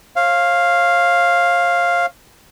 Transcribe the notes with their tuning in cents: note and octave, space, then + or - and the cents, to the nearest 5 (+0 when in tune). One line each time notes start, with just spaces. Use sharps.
C#5 -45 F5 +0